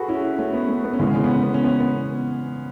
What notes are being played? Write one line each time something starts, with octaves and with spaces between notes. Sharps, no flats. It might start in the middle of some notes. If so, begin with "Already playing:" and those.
Already playing: F#4 G#4 A4 B4
C#4 E4
A3 C#4
B3
A3
B3
C#4
C#3 E3 G#3 B3
C#4
B3
C#4
B3
C#4
B3
B3